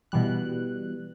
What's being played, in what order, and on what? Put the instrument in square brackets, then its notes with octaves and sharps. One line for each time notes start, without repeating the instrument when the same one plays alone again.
[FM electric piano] B2 E3 G3 F#6